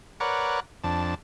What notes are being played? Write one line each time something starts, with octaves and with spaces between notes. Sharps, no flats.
A#4 B4 C#5 D5 F#5
F2 D4 A5